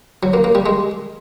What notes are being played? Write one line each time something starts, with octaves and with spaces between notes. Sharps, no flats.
F#3
A#3
A#3
G3
G#3